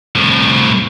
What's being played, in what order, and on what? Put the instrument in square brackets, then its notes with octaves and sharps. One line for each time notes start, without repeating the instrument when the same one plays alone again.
[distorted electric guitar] C2 A2